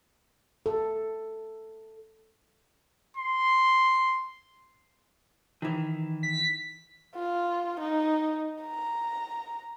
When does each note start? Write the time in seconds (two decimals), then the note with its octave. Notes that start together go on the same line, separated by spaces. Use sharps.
0.66 A4
3.17 C6
5.62 D#3 E3
6.23 B6
7.15 F4
7.80 D#4
8.61 A#5